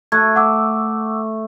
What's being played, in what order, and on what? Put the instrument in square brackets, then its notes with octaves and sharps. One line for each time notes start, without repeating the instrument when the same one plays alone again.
[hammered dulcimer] A3 [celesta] F#6 G#6
[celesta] F#5 D6 E6